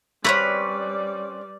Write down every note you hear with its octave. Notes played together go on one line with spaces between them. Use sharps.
G3 A3 C4 C#4 B4 D5